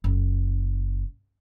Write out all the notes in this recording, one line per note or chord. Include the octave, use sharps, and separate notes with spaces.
F#1